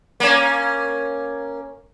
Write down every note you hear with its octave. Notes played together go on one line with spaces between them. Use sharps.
A#3 C#4